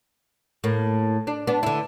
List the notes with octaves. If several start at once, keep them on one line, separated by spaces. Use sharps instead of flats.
A2 A#3
D4
B3 D4
D3 E4